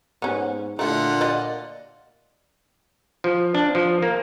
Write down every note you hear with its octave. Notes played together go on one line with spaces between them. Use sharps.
G#2 B3 C#4
A#2 D3 A3 E4 F4 F#5
D5 D#5
F3
D4
F3
A#3